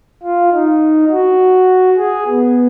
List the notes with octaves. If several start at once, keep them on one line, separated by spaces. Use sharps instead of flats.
F4
D#4
F#4
G#4
B3